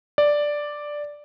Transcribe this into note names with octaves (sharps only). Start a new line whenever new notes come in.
D5